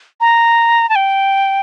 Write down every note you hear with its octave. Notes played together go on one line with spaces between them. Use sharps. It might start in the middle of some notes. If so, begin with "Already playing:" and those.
A#5
A5
G5